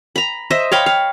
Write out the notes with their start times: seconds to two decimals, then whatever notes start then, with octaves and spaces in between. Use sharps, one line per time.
0.16 A#5 B5
0.50 C5 D#5 E5
0.72 C#5 F5 G5 B5
0.86 F5